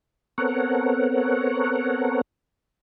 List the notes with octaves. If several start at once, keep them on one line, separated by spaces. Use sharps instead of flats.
B3 C4 A4 A#4 C#5 F#5